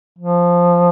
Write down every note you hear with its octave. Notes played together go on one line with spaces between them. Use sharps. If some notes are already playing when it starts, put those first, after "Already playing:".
F3